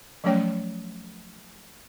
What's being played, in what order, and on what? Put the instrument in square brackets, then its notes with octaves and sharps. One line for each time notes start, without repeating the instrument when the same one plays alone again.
[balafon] F3 F#3 A3 C#4 C#5 G5